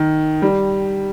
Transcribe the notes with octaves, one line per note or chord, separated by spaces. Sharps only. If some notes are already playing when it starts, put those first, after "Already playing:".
Already playing: D#3
G3